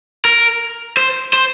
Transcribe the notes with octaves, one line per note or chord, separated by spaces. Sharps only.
A#4
C5
C5